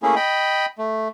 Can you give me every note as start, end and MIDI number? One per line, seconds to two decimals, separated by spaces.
0.03 0.15 57
0.03 0.15 58
0.03 0.15 61
0.03 0.15 64
0.03 0.15 68
0.16 0.66 75
0.16 0.66 79
0.16 0.66 83
0.78 1.08 57